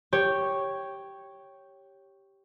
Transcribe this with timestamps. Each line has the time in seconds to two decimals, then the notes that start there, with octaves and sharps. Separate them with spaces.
0.13 G4 C#5